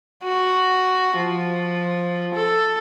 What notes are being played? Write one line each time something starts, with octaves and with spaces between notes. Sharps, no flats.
F#4
F3
A4